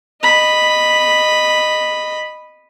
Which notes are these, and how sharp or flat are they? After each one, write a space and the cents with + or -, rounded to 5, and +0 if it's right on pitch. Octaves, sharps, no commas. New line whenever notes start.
D#5 -15 B5 +0